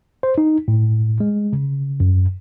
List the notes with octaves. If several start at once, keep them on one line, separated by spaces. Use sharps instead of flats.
C5
D#4
A2
G#3
C#3
F#2